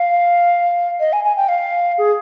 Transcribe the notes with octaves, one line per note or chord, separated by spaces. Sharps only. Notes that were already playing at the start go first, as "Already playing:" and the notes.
Already playing: F5
D#5
G#5
G#5
G5
F5
G#4